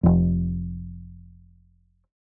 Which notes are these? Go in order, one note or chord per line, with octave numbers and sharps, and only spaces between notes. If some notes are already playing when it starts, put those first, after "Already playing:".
F1 F2